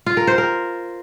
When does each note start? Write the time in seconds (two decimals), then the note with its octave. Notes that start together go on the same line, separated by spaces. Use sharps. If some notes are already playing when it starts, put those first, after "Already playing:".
0.06 F4
0.17 A#4
0.27 C5
0.38 A#4